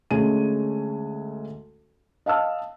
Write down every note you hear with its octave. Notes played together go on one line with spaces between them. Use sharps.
D2 G#3 C#4 G#5 D#7
D#5 F5 A5 E6 F6